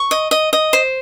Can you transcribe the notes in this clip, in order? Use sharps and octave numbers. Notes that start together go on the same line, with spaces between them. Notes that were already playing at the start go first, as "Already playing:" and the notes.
Already playing: C#6
D#5
D#5
D#5
C5